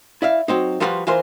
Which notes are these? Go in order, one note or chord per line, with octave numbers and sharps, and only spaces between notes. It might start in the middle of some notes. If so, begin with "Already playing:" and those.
E4 D5 E5 F5
F#3 C4 D#4
F3 G3 B3 F4 F#4 B4
E3 F4 A#4 C5